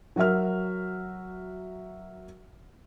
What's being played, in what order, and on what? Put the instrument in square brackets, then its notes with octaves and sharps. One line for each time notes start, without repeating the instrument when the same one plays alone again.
[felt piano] F#3 F#4 A#4 E5 F6